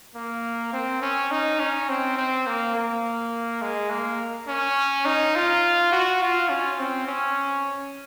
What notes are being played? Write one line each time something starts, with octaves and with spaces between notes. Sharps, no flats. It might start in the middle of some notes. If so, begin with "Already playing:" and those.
A#3
C4
C#4
D#4
C#4
C4
C4
A#3
A#3
G#3
A#3
C#4
D#4
F4
F#4
F4
C#4
C4
C#4